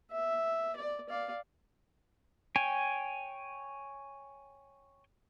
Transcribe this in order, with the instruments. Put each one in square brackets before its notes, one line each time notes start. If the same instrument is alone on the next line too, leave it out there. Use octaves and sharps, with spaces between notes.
[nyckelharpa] E5
D5
D5 F5
[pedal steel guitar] C#5 G5 G#5